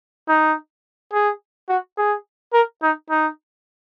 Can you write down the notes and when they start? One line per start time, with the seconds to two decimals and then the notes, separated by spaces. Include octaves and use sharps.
0.28 D#4
1.13 G#4
1.69 F#4
1.98 G#4
2.53 A#4
2.83 D#4
3.10 D#4